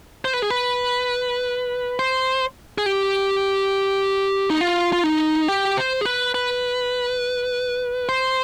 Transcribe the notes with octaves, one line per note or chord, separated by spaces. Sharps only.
C5
B4
G#4
B4
C5
G#4
G4
D#4
F4
F4
D#4
G4
C5
G#4
B4
B4
C5